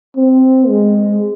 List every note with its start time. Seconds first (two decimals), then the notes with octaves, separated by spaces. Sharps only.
0.17 C4
0.68 G#3